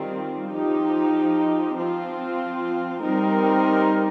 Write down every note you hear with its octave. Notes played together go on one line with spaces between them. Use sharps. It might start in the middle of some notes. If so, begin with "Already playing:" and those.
Already playing: D#3 G3 C4 F4
F3 D#4 G4
F3 C4 F4
G3 C4 D#4 A#4